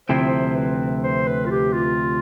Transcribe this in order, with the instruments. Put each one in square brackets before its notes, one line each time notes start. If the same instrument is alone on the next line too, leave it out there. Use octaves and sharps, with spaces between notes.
[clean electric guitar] D2 C3 F3 C4 E4 [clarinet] C5
[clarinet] C5
B4
C5
B4
F4
G4
F4